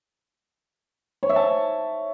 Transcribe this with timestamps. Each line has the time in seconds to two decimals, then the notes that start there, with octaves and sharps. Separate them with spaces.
1.23 C#5
1.29 E5
1.36 A5